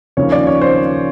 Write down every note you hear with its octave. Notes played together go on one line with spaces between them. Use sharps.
D#2 C#3 F3 C#5
D5
C#5
C5